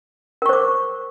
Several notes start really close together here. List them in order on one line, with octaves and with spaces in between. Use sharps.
A#4 C#6 C5 D6